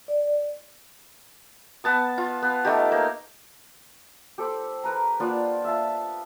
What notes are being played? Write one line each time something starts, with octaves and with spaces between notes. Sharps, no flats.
D5
B3 A5 D#6
F4
B3
A3 D#4 G4
A#3
G4 A4 C5 B5
A#4 B4 A#5
A#3 B3 D4 F4
E5 F5 A5